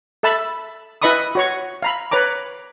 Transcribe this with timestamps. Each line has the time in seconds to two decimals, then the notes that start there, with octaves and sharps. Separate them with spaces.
0.23 A4 E5 A5 B5
1.02 E4 B4 D#5 B5 C#6 D#6
1.35 F#4 C#5 C#6
1.82 F5 A#5 B5
2.11 B4 C#5 A#5 D6